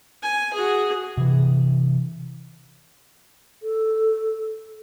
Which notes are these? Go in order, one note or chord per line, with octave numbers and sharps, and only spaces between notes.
G#5
F#4 G#4
C3 E3
A4